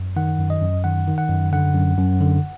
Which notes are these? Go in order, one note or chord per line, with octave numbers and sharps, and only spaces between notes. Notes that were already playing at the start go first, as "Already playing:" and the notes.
Already playing: F#2
D#3 F#5
F#2
D#5
F#2
D#3 F#5
D#3
F#5
F#2
D3 F#5
F#2
F#2
D3